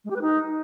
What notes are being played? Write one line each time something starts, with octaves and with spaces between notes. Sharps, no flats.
G#3
G4
B4
D#4